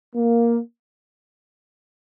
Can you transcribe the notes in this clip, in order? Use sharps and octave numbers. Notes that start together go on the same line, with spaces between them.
A#3